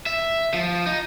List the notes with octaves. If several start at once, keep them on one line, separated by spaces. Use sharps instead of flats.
E5
F3
D#4